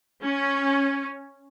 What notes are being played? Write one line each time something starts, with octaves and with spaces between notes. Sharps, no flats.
C#4